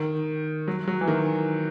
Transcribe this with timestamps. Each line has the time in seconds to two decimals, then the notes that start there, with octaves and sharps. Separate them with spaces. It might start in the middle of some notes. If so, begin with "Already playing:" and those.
Already playing: D#3
0.68 F#3
0.88 F#3
1.01 E3
1.08 D#3